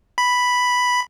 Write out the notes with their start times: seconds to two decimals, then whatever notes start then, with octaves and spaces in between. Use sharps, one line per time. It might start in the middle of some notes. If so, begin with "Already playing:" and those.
0.18 B5